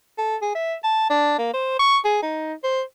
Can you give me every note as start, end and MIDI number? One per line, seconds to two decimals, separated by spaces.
0.18 0.36 69
0.42 0.50 68
0.55 0.75 76
0.84 1.09 81
1.10 1.35 62
1.39 1.52 58
1.53 1.78 72
1.79 1.97 85
2.05 2.21 68
2.22 2.54 63
2.63 2.82 72